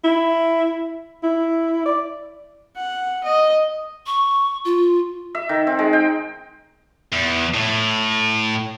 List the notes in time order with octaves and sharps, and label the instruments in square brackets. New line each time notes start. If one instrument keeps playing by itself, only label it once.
[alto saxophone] E4
E4
D5
[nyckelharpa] F#5
D#5
[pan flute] C#6
F4
[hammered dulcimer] E5
D#3
C4
G#3
G5
[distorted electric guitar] E2
A2